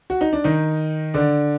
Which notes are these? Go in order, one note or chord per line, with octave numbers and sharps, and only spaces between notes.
F#4
D#4
D4
D#3 D#4
D3 D4